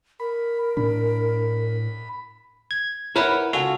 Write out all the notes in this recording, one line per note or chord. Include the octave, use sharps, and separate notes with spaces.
A#4 B5
A2 D4 B5
G#6
E4 A#4 B4 C#5 F#5 B5
C#2 F#4 A4 F5 G#5